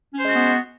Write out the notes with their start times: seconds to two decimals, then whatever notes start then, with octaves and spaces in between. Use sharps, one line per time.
0.14 C#4
0.19 C5
0.23 G#3
0.28 F#4
0.32 B3